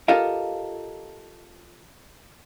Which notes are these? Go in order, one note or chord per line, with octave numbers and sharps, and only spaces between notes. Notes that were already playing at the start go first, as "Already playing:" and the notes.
F4 G4 A4 A#4 D#5 F5